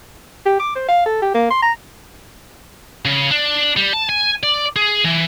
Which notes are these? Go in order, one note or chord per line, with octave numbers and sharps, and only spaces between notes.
G4
D6
C5
F5
A4
G4
A#3
C6
A#5
C#3
D4
G3
A5
G#5
D5
G#4
E3